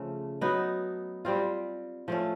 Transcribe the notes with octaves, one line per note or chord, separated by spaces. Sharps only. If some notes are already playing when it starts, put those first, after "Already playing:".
Already playing: C#3 F3 A3 C#4
F#3 B3 D#4
G3 C4 F4
F3 A3 C#4